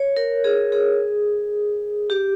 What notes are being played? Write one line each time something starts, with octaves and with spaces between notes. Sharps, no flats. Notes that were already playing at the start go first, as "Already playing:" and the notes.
Already playing: C#5
A#4
G#4
G#4
G4